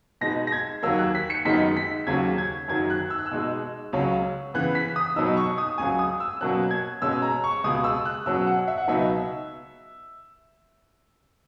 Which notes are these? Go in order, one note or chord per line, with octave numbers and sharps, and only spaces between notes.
B2 G#3 D#4 A#6
A#6
G#6
D#2 D#3 F#3 A#3 E6
F#6
B6
C#7
F#2 D#3 G#3 B3 D#4 B6
B6
D#2 C#3 F#3 C#4 G#6
G#6
F#2 D#3 F#3 G#6
F#6
E6
F#6
E6
B2 G#3 D#4
C#2 C#3 F#3 C#4
C#3 E3 B3 F#6
B6
D#6
B2 F#3 B3 D#4 E6
C#6
D#6
C#2 C#3 F#3 G#5
D#6
E6
B2 F#3 A#3 C#4 F#6
G#6
B2 G#3 C#4 E6
A#5
C#6
C#2 B2 G#3 D#6
E6
F#6
B2 F#3 C#4 E6
F#5
E5
F#5
C#2 B2 F#3 B3 D#4 E5